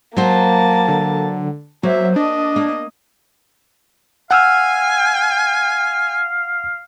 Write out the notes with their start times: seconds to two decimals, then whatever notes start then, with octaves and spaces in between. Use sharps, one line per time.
0.17 F#3 A#3 C5 A5
0.88 D3
1.83 F#3 A#3 C5 E5
2.16 D4 D#5
2.56 A#3
4.31 F5 F#5 G#5 E6 F6